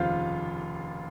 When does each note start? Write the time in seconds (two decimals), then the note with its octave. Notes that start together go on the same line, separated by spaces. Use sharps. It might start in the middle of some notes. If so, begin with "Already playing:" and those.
Already playing: F1 D#2 C#3 F4 C5 F5